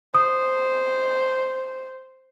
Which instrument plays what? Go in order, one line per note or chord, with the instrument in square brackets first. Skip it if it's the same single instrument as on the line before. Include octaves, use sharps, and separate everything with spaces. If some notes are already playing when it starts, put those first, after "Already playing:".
[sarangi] C5 [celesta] D#6